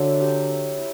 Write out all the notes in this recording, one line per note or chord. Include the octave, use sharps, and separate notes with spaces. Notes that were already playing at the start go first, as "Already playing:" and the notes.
Already playing: D3 F#3 E4 E5
G4
E5
E4